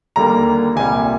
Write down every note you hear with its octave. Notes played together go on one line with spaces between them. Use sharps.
D#2 D3 G3 A#3 A#5
C2 A#2 G3 G#5